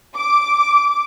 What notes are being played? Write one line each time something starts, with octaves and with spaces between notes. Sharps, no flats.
D6